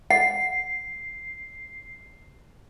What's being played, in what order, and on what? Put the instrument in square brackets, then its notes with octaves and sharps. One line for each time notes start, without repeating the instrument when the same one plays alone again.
[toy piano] F#5 [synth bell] C7